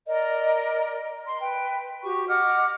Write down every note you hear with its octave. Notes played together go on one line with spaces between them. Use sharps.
A#4 D5 D#5
C6
B4 G5
F#4 G4 C#6
D#5 F#5 D6 F6